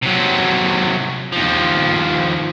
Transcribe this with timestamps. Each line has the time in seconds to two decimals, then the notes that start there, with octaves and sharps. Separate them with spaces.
0.02 C3 F#3
1.33 D#2 F3